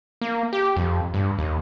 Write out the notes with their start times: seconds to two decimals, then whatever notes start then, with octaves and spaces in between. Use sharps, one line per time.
0.21 A#3
0.53 G4
0.77 F2
1.14 G2
1.39 D#2